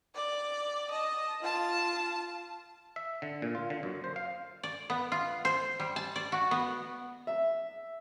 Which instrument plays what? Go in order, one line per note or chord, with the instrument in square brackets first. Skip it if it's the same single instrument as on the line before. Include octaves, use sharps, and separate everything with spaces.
[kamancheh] D5
D#5 A5
F4 A5
[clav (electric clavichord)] E5
D3
A#2
F4
D3
F#2
C5
F5
[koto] D5
B3
F4
C5
G3
A5
D5
F#4
B3
[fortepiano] E5